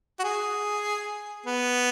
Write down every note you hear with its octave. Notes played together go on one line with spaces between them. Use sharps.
F#4
G#4
B3